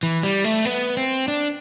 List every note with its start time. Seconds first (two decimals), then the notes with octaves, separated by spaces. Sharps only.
0.03 E3
0.23 G3
0.44 A3
0.65 B3
0.97 C4
1.28 D4